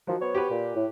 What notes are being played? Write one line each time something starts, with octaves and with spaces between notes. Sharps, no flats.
D#3 F3 F#3
B3 C5 C#5
G4 B4
A#2
A2